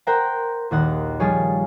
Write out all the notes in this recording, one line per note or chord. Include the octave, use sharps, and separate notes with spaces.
A#4 C5 F#5 G5 A#5
A#1 D#2 F#5
F3 G3 F4 G#4 C#5